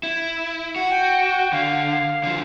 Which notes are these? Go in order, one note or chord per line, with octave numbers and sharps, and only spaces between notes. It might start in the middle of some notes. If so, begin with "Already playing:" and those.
E4
F#4
G5
D3 F5
D3 F3